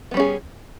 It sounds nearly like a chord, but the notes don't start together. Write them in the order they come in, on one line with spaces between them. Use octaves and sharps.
B3 G3 C#4 G#4